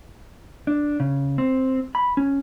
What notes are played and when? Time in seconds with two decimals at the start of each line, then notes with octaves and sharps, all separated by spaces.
0.67 D4
1.00 C#3
1.38 C4
1.95 B5
2.17 C#4